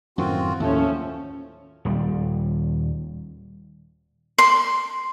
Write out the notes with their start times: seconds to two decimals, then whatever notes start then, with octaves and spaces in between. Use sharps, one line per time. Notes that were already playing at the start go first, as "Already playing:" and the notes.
0.18 F#2 A2 D#3 C4 F4 F#4
0.60 D#2 A2 D#3 F3 A3 C#4 A4
1.85 D#1 G3
4.38 C6